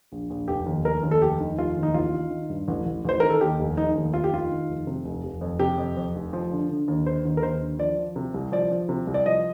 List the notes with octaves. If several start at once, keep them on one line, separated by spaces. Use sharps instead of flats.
A#1
A#1
F1 G4
D#2
F1 A#4
D#2
A4
F1 G4
D#3
F1 F4
D#2
D#4
A1 F4
D#3
D#3
G2
A1
A1
A1 C5
D#3 A#4
A4
D#2 G4
F1
F1 D#4
D#2
F1 F4
G4
D#3 F4
D#3
F1
C3
F1
F1
F2
C3 G4
F2
F2
F1
F3
D3
D3
D#2
D3 C5
D#2
A#4
D#2 C5
D3
F3 D5
F3
C3
C2
F3 D5
F3
C3
C2
D5
F3 D#5